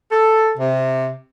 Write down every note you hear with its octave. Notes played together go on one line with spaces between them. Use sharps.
A4
C3